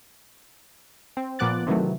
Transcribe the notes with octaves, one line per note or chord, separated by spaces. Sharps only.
C4
A#2 F3 B3 D6 F#6 A6
C3 D#3 E3 F#3 A3